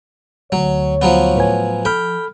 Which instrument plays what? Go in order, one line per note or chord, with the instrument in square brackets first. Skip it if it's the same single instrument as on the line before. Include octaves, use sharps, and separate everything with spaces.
[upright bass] D2 [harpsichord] F#3 [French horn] C#5
[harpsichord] F3 F#3 B3
[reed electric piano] A2 B4 G#5
[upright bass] F3 [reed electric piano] A4 B5 F6 [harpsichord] G5